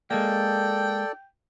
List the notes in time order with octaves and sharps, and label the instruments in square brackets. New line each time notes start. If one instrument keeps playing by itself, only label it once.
[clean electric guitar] G#3 A#3 [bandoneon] A4 D5 [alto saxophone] G5